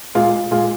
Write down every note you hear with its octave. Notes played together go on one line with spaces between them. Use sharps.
A#2 G#3 F4
A#2 G#3 F4